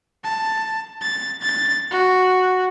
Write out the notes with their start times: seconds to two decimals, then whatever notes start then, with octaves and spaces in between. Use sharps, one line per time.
0.24 A5
1.01 A6
1.42 A6
1.91 F#4